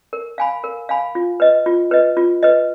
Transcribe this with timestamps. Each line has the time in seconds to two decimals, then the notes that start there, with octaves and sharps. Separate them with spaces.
0.13 A#4
0.38 F5 G#5 B5
0.64 A#4
0.89 F5 G#5 B5
1.15 F4
1.40 B4 D#5
1.66 F4
1.91 B4 D#5
2.17 F4
2.43 B4 D#5